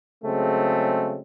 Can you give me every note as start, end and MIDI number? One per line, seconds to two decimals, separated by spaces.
0.24 1.21 49
0.24 1.21 54
0.24 1.21 56
0.24 1.21 57
0.24 1.21 60